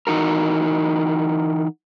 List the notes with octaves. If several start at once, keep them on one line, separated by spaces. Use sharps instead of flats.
E3 D#4 F#4 A#4